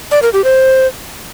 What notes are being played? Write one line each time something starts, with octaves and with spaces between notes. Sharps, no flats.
D5
A#4
G4
C5